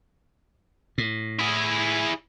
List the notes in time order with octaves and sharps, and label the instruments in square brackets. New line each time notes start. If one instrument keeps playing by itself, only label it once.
[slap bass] A2
[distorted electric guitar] E4 G#4